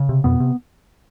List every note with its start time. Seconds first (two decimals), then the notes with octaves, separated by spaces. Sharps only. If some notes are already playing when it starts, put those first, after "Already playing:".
Already playing: C#3
0.09 C3
0.24 F2 B2 B3
0.40 C3